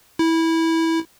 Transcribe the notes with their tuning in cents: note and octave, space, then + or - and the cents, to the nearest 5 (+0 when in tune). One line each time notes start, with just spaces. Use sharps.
E4 -15